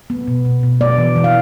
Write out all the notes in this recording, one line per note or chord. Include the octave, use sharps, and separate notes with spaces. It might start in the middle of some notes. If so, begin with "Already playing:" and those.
B3
B2
B2
B2
B3 D5
E3
E3
F5